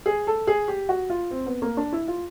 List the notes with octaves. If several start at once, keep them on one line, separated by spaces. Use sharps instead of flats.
G#4
A4
G#4
G4
F#4
F4
C4
B3
A#3
D4
E4
F4